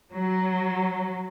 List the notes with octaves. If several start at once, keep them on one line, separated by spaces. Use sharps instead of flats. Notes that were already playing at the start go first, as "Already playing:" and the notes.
F#3